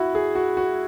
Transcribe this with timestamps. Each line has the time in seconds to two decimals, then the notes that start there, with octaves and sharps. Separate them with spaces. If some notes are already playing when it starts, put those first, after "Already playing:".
Already playing: E4 F#4
0.15 G#4
0.35 F#4
0.57 F#4